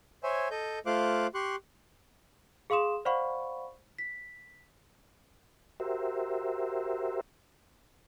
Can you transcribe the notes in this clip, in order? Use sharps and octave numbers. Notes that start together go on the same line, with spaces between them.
C5 C#5 E5 G#5
A4 D#5 G6
A3 F4 C5 F5 D6 F#6
G4 C6 C#6 F#6
G#4 F5 C6 D#6 E7
C5 D5 F5 F#5 B5 C#6
B6
F#4 G4 A#4 C5 E5